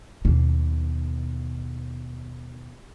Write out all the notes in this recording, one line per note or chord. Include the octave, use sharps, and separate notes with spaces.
D#2 B2